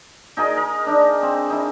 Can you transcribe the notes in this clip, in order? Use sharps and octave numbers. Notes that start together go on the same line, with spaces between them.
D#4 G#4 A#4 D#5
A#4
D4 D#4
C4
D#4 E4